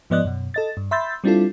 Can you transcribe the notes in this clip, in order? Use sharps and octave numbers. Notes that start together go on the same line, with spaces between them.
G#2 F3 B3 D5 D#5 F#6
F#2 B2
A4 D#5 A6
G2
E5 B5 C6 E6 G6 A6
G3 C4 D4 E4 F4 A4